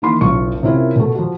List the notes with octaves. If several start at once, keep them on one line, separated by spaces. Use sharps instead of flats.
D#3 E3 A#3 B5 C6
F#1 B1 F4 C#6
C3 C#4 E4 F4 A#4
B2 A3
F3 F#4